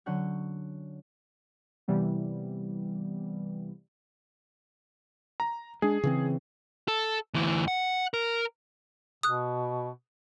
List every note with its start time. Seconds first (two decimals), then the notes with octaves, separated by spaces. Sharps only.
0.06 D3 F#3 C#4 F#5 G6
1.88 C3 E3 G3 B3
5.40 A#5
5.82 G#3 D4 G#4
6.03 C#3 E3 C4
6.88 A4
7.34 D2 E3
7.68 F#5
8.14 A#4
9.23 B2 D#6 F#6